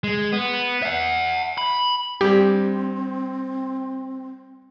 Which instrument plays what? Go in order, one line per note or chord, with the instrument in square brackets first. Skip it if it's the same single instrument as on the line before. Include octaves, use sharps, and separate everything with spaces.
[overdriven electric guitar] G#3
B3
E5 F#5
B5
[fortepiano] G2 [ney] C4 [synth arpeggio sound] G4